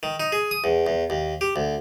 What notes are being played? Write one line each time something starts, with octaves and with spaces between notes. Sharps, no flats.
D#3
D#4
G#4
D#6
E2
E2
D#2
G4
D2